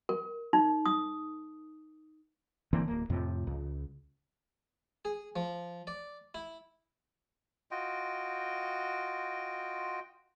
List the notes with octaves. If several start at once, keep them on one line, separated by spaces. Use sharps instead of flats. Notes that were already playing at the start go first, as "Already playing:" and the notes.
A#4
D#4
D#6
D3 E3 A#3 C4
D1 A#3
F2 A2 C3 F3
C#2
G#4
F3
D5
E4
F4 F#4 D#5 G5